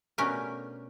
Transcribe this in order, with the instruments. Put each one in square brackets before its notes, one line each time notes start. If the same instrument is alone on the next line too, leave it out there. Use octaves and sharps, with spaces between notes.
[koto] B2 A3 C#4 D4 G4 A#4